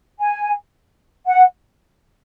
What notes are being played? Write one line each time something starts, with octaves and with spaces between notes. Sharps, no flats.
G#5
F#5